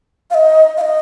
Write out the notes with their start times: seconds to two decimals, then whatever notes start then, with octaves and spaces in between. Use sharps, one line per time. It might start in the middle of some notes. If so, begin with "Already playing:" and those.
0.31 F5
0.35 D#5
0.77 F5
0.81 D#5